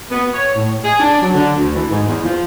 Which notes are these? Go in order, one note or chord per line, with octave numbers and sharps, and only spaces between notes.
B3
C#5
A2
G#4
D4
F#3
D3
D2
E3
G#2
E2
F3